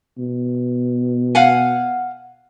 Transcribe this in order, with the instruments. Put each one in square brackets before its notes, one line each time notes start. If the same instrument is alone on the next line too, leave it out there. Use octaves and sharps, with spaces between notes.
[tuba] B2
[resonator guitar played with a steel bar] F5 F#5 G#5